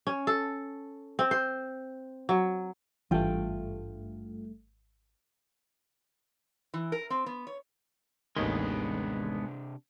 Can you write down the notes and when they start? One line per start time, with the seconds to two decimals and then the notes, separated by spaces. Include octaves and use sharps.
0.07 C#4
0.27 A4
1.19 C4
1.31 C5
2.29 F#3
3.11 G#1 G2 E3 A3 F4 G5
6.74 E3
6.92 A#4
7.10 C4
7.26 B3
7.47 C#5
8.36 A1 D#2 C3 D#3 G#3 B3 D4